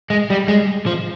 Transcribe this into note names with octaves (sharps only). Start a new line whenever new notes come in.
G#3
G3
G#3
F3